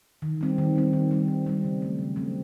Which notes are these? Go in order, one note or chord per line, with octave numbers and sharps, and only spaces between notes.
D#3
G3 C4
D#3
G3 C4
D#3
G3 C4
D#3
G3 C4
C#3
F#3 A3 C4
C#3
F#3 A3 C4